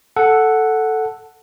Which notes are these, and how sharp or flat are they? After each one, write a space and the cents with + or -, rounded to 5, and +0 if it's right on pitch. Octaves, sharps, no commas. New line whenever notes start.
A4 +0 F#5 +0